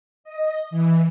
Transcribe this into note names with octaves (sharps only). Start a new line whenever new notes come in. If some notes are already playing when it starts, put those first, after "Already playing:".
D#5
E3